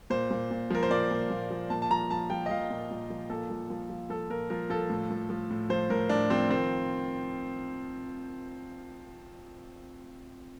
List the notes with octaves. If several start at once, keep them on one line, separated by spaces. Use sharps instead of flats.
A#2 C5
A#2
A#2
F3 A#4
C5
A#2 D5
A#2
A#2
F3
A#2 A5
A5
F3 A#5
F3 A5
F3 G5
D#5
F3 F5
A#2
A#2
F3
A#2 A4
F3
F3
F3
F3 A4
A#2 A#4
F3 A#4
F3 A4
A2
F3
F3
A2
F3 C5
A2 A#4
A2 D4
F3 C4
D#3 C4